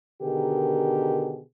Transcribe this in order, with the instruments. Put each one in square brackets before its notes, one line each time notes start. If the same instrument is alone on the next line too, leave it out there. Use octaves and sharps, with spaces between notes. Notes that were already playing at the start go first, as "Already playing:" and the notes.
[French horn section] B2 D3 D#3 G4 G#4 A#4